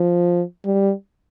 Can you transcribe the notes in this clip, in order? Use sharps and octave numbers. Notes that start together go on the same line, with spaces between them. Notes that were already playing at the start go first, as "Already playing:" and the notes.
Already playing: F3
G3